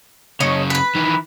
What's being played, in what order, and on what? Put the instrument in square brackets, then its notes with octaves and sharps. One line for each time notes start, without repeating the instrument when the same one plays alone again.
[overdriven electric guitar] F#2 C#3 [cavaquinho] C#5 D#5 C#6
[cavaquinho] B4 B5
[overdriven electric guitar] D#3 E3